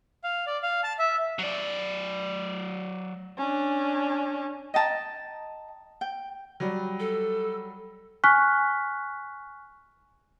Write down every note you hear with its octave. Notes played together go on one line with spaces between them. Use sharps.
F5
D5
F5
A5
E5
F#3 D5
C#4 D4
D#5 G5 A5 A#5
G5
F#3 G3
A4
G#5 C#6 F6 F#6 B6